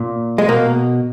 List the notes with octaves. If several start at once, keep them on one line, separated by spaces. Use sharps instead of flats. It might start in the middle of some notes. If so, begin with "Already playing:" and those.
Already playing: A#2
G#3
B2 A#3